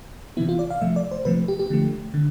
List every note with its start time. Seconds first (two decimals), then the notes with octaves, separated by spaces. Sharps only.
0.37 C3 E3 B3 E4
0.49 F4
0.59 D5
0.70 F5
0.81 C3 F3 A3 E5
0.96 D5
1.11 C5
1.25 C3 F3 A3 B4
1.48 G4
1.59 G4
1.70 D3 F3 A3
2.14 D3